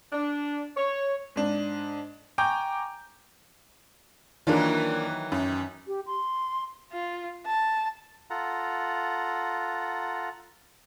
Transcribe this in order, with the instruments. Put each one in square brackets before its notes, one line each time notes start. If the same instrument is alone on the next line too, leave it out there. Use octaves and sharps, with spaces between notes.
[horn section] D4
C#5
[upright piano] G#2 D4
G5 G#5 A#5 C#6 D6 G6
[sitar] D#3 E3 F#3 [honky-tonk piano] A#3 D4 F4
[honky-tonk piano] F#2
[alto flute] G4
C6
[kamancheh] F4
A5
[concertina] F4 A4 F#5 A#5